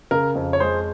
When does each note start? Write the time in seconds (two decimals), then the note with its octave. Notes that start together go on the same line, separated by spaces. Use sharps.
0.11 C#3 A#4
0.35 F2
0.53 C#5
0.60 G#3 G#4 C5